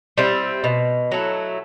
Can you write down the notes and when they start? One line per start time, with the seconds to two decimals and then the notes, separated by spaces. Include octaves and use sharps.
0.18 G3 C4 E4
0.64 B2
1.12 F#3 A3 E4